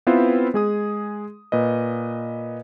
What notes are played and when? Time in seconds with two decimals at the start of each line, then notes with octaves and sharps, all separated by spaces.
0.07 B3 C4 E4 F4 B4 C5
0.54 G#3 G#4 D#6
1.52 A#2 B4 D#5